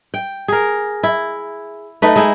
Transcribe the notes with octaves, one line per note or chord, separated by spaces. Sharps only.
G5
G#4 A#4
E4
A3 D#4 B4
G#3 D#4 E4